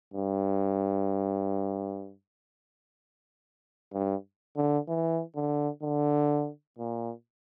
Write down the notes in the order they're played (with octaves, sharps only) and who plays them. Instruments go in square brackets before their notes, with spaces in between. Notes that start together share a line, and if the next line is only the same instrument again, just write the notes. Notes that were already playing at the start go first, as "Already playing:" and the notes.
[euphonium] G2
G2
D3
E3
D3
D3
A#2